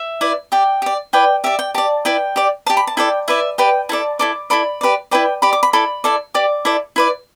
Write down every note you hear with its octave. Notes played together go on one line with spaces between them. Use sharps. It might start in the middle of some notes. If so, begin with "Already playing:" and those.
Already playing: E5
E4 B4 D5
G4 D5 G5
G4 D5
E4 B4 D5 G5
G4 D5 E5
G5
G4 D5 A5
E4 B4 D5 G5
G4 D5
G4 D5 A5
B5
A5
E4 A4 D5 G5
E4 B4 D5 E5
G4 B4 D5 G5
E4 A4 D5 A5
E4 A4 D5 D6
E4 A4 D5 B5
G4 B4 D5
E4 B4 D5 G5
G4 D5 B5
D6
B5
E4 A4 D5 B5
E4 A4 D5
G4 D5 D6
E4 A4 D5
E4 B4 D5